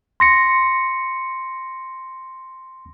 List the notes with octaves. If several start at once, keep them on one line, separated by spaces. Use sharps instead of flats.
C6 A#6 C#7